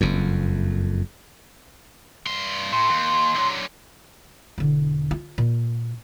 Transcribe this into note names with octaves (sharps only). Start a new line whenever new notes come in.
F#1 F2
G2 C6
A2 C6
D#2
D3 F#3
E1 D3
F4
A#2